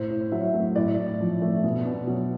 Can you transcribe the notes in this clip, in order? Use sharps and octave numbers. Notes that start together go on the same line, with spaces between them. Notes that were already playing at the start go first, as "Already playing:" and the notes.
Already playing: A2 C5
A2
F#3 E5
A3
A2 D5
A2
F3
A3
B2
B2
F#3